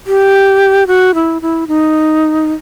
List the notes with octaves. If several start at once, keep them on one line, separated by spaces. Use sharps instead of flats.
G4
F#4
E4
E4
D#4